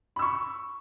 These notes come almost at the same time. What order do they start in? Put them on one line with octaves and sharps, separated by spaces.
B5 E6 C#6